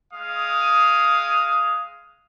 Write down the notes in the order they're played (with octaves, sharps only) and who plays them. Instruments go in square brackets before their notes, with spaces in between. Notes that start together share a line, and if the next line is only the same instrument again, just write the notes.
[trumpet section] G#3 F5 D#6